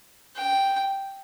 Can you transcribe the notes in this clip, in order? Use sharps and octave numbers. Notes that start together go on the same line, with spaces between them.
G5